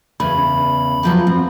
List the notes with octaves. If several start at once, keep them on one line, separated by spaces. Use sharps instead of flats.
E2 C#3 B5
E2 F3 F#3
C4